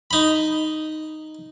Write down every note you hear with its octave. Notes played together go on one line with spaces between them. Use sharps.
D#4 B5